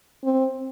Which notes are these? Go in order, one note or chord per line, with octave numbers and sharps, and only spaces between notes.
C4